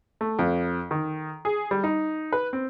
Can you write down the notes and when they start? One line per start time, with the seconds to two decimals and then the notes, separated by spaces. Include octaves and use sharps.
0.21 A3
0.39 F2
0.91 D#3
1.45 G#4
1.71 G3
1.84 D#4
2.32 B4
2.53 C4